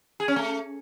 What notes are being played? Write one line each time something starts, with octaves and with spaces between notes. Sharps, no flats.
G#4
C#4
A3